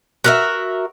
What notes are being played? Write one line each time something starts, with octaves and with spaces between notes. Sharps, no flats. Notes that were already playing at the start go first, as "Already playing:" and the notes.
F#4 A#4 E5